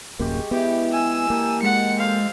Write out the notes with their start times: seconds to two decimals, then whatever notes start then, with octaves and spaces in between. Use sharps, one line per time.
0.20 D1 F#2 G#3 A#3 G4 C#6
0.51 E3 B3 G4
0.93 G#5 E6
1.30 A#3 G4 A5 A#5
1.62 G#3 F#5 C#7
1.99 A4 C5 F5